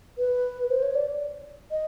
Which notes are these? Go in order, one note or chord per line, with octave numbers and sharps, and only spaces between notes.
B4
C5
C#5
D5
D#5